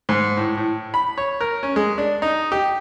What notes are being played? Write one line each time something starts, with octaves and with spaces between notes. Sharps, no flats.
G#2
A2
A2
B5
C#5
A#4
C#4
G#3
D4
D#4
G4